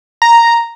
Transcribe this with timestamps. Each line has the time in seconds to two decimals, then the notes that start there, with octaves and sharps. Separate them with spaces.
0.22 A#5